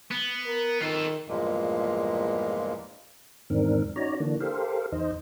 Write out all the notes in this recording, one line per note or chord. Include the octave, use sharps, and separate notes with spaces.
B3
A#4
D#3 F4 A4
E2 G2 A#2 F3 G#3 A#3
E2 G#2 D#3 C4 D4 A#4
C#4 D#4 F#4 C#5 D5 A#5
D3 E3 A#3 D4
G4 A4 A#4 C5 F5
E2 D#4 C5 D#5